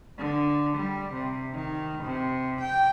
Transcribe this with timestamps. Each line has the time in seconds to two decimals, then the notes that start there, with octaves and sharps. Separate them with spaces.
0.18 D3
0.77 G3
1.14 C3
1.54 D#3
2.03 C3
2.61 G5